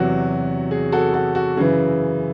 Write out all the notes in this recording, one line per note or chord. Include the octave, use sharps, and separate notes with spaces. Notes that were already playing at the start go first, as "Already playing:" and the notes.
Already playing: E2 C3 F#3 F#4
G#4
F#4 A4
F#4 A4
F#4
F#2 C#3 E3 G#4